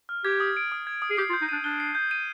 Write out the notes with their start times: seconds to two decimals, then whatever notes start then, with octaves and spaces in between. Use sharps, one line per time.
0.09 F6
0.24 G4 G#6
0.40 D#6
0.57 D7
0.72 D#6
0.87 G#6
1.02 D#6
1.10 G#4
1.17 G4 C7
1.30 F4
1.33 G6
1.41 D#4
1.49 D4 D#7
1.64 D4 G7
1.80 C7
1.95 G6
2.11 D#7